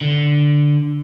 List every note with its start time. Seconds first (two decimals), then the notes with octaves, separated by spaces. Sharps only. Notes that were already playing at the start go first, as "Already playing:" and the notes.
0.02 D3